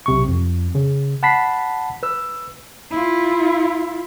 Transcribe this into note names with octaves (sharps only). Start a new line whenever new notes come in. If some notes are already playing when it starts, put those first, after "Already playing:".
B1 C3 C#6
F2
C#3
F#5 A5 B5 B6 C7
B4 E6
E4 F4